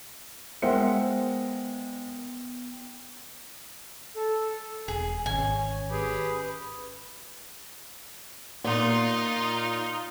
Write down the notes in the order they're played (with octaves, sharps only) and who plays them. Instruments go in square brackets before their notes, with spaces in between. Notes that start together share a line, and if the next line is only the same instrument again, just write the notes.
[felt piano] G#3 A#4 C#7 [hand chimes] B3 G5 [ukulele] C5 [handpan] E5 F#5
[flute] A4
[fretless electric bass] E1 [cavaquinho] G#4
[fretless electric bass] G#1 [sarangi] C#4 [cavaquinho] G#5
[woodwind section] C#4 G4 G#4 [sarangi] B4
[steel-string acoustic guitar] A#2 [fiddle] D#4 F4